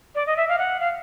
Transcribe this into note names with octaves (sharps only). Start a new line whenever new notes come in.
D5
D#5
E5
F5
F#5
F5